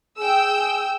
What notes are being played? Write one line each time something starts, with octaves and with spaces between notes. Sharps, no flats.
G#4 G5 E6